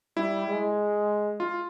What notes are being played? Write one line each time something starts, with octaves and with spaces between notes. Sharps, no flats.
G3 E4
G#3
F4